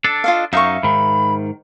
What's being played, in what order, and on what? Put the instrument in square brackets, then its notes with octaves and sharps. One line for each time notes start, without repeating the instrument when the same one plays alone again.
[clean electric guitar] D4 A4
[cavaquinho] F4 D#5 F5
[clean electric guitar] F#2 D#4 [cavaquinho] E5 F5 C#6
[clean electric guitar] G#2 D#3 [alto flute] B5